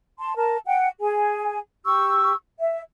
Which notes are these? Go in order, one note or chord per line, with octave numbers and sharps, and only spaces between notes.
A5 C6
A#4 A5
F#5 G5
G#4 G#5
G4 C#6 E6
E5